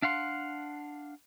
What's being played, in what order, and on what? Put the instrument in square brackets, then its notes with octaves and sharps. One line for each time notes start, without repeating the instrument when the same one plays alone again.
[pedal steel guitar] D4 F5 F#5 C6